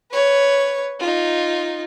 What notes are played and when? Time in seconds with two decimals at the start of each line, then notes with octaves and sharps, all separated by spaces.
0.12 B4 C#5
1.00 D#4 F4